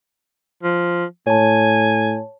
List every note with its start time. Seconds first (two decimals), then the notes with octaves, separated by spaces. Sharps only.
0.63 F3
1.27 A2 C#5 G#5 A5